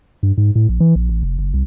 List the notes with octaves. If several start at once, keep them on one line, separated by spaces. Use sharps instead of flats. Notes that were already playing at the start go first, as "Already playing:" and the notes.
G2
G#2
A2
A#1
E3
A#1
A1
F1
F#1
C2